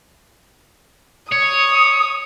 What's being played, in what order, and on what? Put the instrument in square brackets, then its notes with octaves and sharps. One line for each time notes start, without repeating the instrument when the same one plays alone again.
[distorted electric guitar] C#5 [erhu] D#6